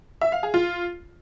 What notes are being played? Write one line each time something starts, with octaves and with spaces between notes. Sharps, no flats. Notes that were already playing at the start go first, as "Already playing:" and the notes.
E5
F5
G#4
F4